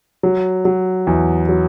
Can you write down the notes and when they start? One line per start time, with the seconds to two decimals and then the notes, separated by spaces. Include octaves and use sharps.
0.23 F#3
0.65 F#3
1.07 E2
1.49 F#3